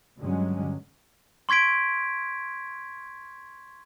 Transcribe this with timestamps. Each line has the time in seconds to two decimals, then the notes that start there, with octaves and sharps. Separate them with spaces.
0.19 G2 D3 F#3 G#3 C#4
1.49 C6 C#6 G#6 B6 D7